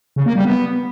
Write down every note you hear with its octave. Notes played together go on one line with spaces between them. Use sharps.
C#3
A#3
G3
B3